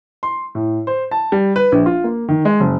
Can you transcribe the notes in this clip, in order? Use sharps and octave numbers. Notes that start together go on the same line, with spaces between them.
C6
A2
C5
A5
G3
B4
A#1
F4
A#3
D#3
G#3
F#1